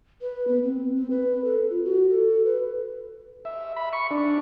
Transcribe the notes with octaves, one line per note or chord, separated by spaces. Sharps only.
B4
B3
C4
C4
B4
A4
F4
F#4
A4
B4
E5
B5
C#6
D4